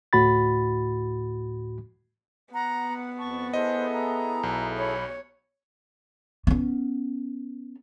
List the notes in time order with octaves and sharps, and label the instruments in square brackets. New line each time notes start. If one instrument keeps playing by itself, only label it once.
[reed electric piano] D2 A2 F#4 B5 A6
[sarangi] B3 [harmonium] F#5 [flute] A#5
[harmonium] F2 A5 [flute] C#6
[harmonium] E4 G#4 A4 [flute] C5 [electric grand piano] D#5
[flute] A#5
[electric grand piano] B1
[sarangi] C#5 [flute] B5
[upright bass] B3 C#4